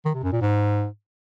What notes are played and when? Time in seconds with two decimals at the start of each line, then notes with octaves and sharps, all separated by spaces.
0.05 D#3
0.14 C3
0.23 F#2
0.32 A#2
0.41 G#2